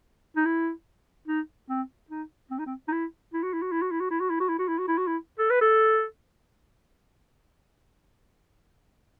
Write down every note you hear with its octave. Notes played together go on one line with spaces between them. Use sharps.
D#4
E4
D#4
C4
D#4
C4
D#4
C4
D#4
E4
E4
F#4
E4
F#4
E4
F#4
E4
F#4
E4
F#4
E4
F#4
E4
F#4
E4
F#4
E4
F#4
E4
A4
B4
A4